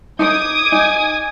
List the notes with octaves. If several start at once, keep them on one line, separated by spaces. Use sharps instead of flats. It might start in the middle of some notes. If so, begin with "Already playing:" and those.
D#4 D6 D#6 G#6
D#4 G#5